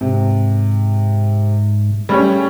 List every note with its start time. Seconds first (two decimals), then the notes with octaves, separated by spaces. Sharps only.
0.01 G#2 C3
2.09 G3 A3 C#4 G#4 C#5